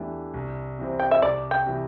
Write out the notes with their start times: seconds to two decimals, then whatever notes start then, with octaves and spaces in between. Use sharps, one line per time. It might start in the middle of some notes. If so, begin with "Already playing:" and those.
Already playing: E2 E3 A3 D4 G4
0.34 C2
0.79 C3 E3 C4
1.00 G5
1.11 E5
1.22 C2 D5
1.51 G5
1.66 C3 E3